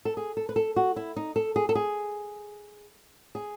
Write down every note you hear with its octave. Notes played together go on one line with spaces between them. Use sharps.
A4
G#4
A4
B4
A4
F#4
E4
D#4
A4
G#4
A4
G#4
G#4